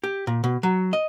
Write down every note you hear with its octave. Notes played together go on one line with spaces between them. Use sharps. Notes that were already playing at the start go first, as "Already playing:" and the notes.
G4
A#2
B2
F#3
D#5